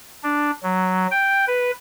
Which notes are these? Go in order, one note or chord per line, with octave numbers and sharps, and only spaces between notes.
D4
F#3
G5
B4